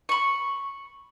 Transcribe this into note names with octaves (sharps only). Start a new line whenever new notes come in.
B5 C#6